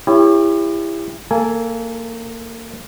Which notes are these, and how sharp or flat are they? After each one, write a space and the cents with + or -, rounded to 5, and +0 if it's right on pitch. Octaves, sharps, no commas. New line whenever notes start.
E4 +20 G4 +35 C#5 +0
A#3 -25 A4 +0 G#5 +0